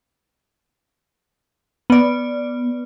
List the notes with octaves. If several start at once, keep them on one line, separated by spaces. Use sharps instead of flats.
B3 D5